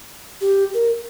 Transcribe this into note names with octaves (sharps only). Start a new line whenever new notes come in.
G4
A#4